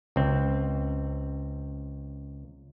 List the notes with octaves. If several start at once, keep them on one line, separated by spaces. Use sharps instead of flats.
C#2 C4